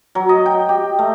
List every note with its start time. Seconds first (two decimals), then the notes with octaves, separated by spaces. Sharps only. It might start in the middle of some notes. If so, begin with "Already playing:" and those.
0.15 F#3
0.29 D#5
0.46 G5
0.69 G4
0.99 A3